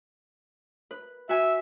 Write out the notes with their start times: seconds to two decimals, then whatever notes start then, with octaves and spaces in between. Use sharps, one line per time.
0.91 B4
1.29 F#4 E5 G#5